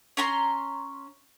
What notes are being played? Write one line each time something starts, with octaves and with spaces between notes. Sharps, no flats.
C#4 A#5 C6